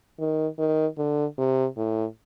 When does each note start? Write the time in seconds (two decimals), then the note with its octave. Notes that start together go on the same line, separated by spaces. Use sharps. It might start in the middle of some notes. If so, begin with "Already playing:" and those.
0.20 D#3
0.59 D#3
0.98 D3
1.38 C3
1.77 A2